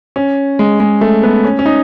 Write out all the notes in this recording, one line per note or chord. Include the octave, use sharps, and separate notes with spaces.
C#4
G#3
G#3
A3
B3
C#4
C#4
D#4